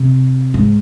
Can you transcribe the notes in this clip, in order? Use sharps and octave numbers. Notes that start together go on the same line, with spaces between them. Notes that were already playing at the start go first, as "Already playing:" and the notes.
Already playing: C3
G#2